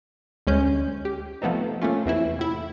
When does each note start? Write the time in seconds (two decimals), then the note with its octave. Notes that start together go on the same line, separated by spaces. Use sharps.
0.47 D2 G#3 C#4 G6
1.05 G4
1.42 F3 A3 B3 C4 D#4
1.82 F3 A3 A#3 C#4 F4
2.06 E2 C3 E3 E4
2.39 A2 E4